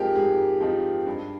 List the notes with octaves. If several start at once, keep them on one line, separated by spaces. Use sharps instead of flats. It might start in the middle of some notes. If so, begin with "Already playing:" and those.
Already playing: G#2 F3 C4 D#4 G4 G#4 A#4
G#2 G#4
F3 C4 D#4
G2